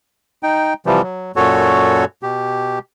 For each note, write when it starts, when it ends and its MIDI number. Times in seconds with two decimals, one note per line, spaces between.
0.43 0.74 63
0.43 0.74 79
0.86 1.02 48
0.86 1.02 52
0.86 1.02 53
0.86 1.02 55
1.03 1.32 54
1.36 2.05 42
1.36 2.05 46
1.36 2.05 66
1.36 2.05 69
1.36 2.05 73
2.23 2.79 47
2.23 2.79 67